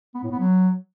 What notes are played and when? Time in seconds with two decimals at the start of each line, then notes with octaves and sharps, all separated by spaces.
0.15 B3
0.23 A2
0.31 B3
0.40 F#3